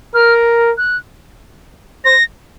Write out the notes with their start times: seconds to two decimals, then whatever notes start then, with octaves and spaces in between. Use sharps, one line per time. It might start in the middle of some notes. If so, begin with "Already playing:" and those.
0.14 A#4 F6
0.78 F#6
2.05 C5 A#6